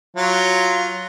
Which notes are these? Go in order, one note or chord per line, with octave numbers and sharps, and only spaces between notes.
F#3 F4